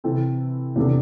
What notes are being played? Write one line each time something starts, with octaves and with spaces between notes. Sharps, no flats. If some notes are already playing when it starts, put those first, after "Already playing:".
C3 E3 C4 A4
E2 C3 G3 D4 A4